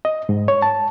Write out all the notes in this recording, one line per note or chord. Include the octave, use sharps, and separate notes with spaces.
D#5
G#2
C#5
A5